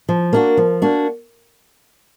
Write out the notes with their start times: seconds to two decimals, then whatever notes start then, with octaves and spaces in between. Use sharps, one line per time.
0.09 F3
0.33 A#3 D4 F#4
0.57 F3
0.82 A#3 D4 F#4